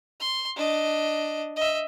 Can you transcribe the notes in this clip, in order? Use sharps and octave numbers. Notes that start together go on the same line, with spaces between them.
C6
D4 D#5
D#5 E5